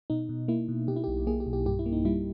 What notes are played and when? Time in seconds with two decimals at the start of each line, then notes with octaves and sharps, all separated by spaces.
0.10 B2 D#4
0.29 B2
0.48 A#3 E4
0.68 B2
0.88 B2 G4
0.96 E4
1.04 B1 G4
1.27 A#3 G#4
1.40 G4
1.47 B1
1.53 G4
1.66 G2 G4
1.79 E4
1.86 A#3
1.92 D#4
2.05 G3 E4